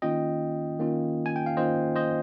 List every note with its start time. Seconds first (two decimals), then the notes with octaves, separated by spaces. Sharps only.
0.02 D#3 A#3 C#4 F4 D#5 G5
0.80 D#3 A#3 C#4 F4
1.26 G#5
1.36 G5
1.46 F5
1.57 D#3 A#3 C#4 F4 C5 D#5
1.96 C5 D#5